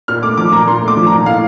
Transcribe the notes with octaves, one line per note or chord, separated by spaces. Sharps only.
A#2 F6
A3 D6
F3 D6
A#2 A#5
A#2 C6
A3
D6
F3
A#5
A#2
A2 F5